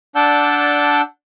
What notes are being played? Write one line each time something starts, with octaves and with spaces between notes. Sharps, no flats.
D4 D5 F#5 A5 E6 G6